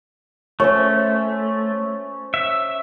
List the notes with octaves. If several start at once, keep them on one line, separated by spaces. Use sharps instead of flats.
A3 C#4 C5 C#5
E5